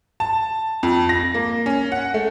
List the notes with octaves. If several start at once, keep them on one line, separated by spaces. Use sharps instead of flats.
A5
F2
A#6
A#3
C#4
F#5
A3